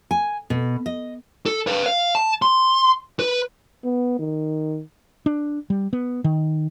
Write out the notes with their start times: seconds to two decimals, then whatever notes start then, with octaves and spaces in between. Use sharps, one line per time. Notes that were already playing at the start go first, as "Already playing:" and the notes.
0.11 G#5
0.50 B2
0.86 D#5
1.46 A4
1.67 B4 F5
1.86 F5
2.15 A5
2.42 C6
3.19 B4
3.84 B3
4.19 D#3
5.26 D4
5.70 G3
5.93 B3
6.24 D#3